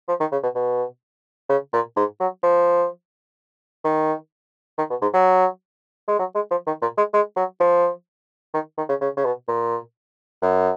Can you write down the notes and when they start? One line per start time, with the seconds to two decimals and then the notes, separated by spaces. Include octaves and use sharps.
0.08 F3
0.20 D#3
0.32 C#3
0.43 B2
0.55 B2
1.49 C#3
1.73 A#2
1.96 G#2
2.20 F#3
2.43 F3
3.84 D#3
4.78 D#3
4.90 B2
5.02 G#2
5.13 F#3
6.08 G#3
6.19 F#3
6.35 G#3
6.51 F3
6.67 D#3
6.82 A#2
6.97 G#3
7.13 G#3
7.36 F#3
7.60 F3
8.54 D#3
8.78 D#3
8.89 C#3
9.01 C#3
9.17 C#3
9.24 B2
9.48 A#2
10.42 F#2